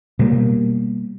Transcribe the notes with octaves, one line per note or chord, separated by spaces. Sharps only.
B2 G3 A#3